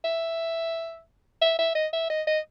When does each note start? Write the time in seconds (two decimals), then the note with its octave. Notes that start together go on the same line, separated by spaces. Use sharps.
0.04 E5
1.42 E5
1.58 E5
1.75 D#5
1.93 E5
2.10 D#5
2.27 D#5